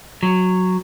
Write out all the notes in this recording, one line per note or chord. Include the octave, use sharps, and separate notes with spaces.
F#3